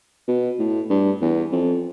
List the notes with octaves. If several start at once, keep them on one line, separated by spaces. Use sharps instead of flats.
B2
A2
G2
E2
F2